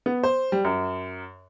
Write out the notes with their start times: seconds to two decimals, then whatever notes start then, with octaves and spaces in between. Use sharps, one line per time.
0.06 B3
0.23 C5
0.52 G3
0.64 F#2